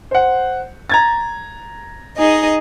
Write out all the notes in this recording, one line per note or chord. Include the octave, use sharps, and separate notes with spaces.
C5 F#5
A#5 G#6 A6
D#4 G#4 D#5